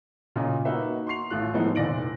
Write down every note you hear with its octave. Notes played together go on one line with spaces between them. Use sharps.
A#2 C#3 F4 D#5 A#5
A#3 D#4 F#4 B4 E5
C6 C#6 C7 F7
A1 A3 F4 F#6
A2 F3 G#3 B3 D#4 E4
F1 A#2 D5 A#6 D7 F#7